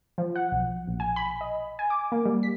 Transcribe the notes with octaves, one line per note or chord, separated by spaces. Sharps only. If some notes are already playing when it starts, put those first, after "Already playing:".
F3
F#5
B1
A#1
G#5
B5
D#5
G#5
D6
A#3
G3
B6